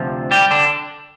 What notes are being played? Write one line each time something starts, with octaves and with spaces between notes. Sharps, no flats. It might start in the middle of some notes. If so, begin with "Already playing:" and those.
Already playing: D2 C3 F3
G3 G4
D3 D4